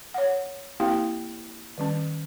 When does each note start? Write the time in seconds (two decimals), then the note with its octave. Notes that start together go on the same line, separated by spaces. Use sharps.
0.14 C#5 F#5
0.80 A#3 C4 E4 G4 F5 G5
1.78 D#3 G3 C#4